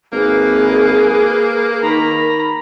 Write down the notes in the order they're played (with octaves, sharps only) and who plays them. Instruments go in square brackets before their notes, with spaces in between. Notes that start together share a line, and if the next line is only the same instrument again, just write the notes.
[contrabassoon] G#1 [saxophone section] A#3 [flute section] G#4 B4
[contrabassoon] D#3 [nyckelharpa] A#5 B5